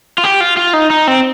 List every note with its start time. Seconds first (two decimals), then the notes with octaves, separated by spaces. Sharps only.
0.18 F4
0.24 G4
0.41 F4
0.57 F4
0.73 D#4
0.90 D#4
1.08 C4